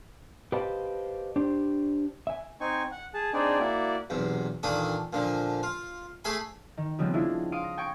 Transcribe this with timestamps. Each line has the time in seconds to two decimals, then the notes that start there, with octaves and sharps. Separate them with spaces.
0.52 G4 B4 C5 D#5 F5 A5
1.36 D4 G4 C5
2.27 E5 G#5
2.61 C4 D#4 G#5 C#6
2.92 F#5
3.14 G#4 A5
3.33 C4 D4 D#4 G#4 D5
3.59 A#3 E4 F#4 D5
4.10 B1 E2 C3
4.63 A#2 D#3 E3 D4 A4 D#6
5.13 A#2 D3 F3
5.63 F4
6.25 A3 G#4 E5 G#5 B5 C6
6.77 D#3
6.99 C#3 F3 G3 G#3 B3 C4
7.13 G#3 D4 E4 F4 G#4
7.52 F5 C6 D#6 D7 D#7
7.64 A#6
7.78 G5 G#5 C#6 A#6 D7